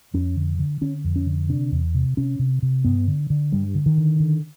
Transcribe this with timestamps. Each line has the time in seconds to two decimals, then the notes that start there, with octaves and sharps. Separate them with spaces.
0.14 F2 C#4
0.36 D3
0.59 D3
0.81 D3 C#4
1.04 F2
1.16 C#4
1.27 D3
1.49 C3 D4
1.71 E2
1.95 C3
2.17 C3 C#4
2.39 C3
2.62 C3
2.85 G2 B3
3.07 D3
3.30 D3
3.52 G2 G3
3.75 D3
3.86 D#3
3.97 D3
4.20 D3